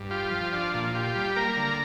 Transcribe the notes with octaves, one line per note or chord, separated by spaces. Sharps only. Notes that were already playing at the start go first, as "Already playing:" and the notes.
Already playing: G2
F4 G4
F3
D4 F4
A#2
F4
F4 G4
G3
A#3 A#4
D3